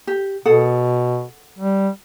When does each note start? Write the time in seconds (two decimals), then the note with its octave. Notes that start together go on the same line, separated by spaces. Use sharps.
0.07 G4
0.46 B2 G#4 A4 F#5
1.59 G3